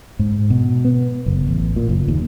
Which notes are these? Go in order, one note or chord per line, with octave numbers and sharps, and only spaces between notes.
G#2
B2
B3
F#1
A1
A#2
F#1
D#2